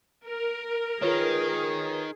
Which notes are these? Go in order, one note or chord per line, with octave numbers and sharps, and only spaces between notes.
A#4
D#3 F4 G#4 B4 C#5